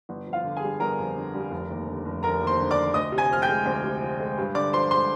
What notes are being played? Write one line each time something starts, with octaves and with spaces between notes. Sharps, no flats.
G1
F2
F4 F5
D3
G#4 G#5
G3
G1 A#4 A#5
F2
D3
G3
F1
D#2
D3
F1
F1 A#4 A#5
D#2
C5 C6
D3
D5 D6
F1
D2 D#5 D#6
C3
G#5 G#6
F3 F6
G5 G6
G#3
D2
C3
F3
G#3
G2
D3 D5 D6
F3 C5 C6
G#3 C5 C6